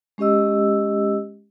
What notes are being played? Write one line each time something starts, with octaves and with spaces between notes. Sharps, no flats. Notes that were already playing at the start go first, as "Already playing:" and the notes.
G#3 C#4 G4 D#5 E6